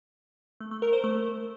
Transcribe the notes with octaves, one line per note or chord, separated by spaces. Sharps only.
A3
A3
A#4
C5
A3